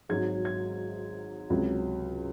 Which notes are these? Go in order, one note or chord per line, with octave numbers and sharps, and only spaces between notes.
G#1 G#2 F#3 G#6
G#6
C#2 C3 F#3